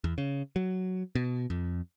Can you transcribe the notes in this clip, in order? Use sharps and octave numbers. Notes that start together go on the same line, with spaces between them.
E2
C#3
F#3
B2
F2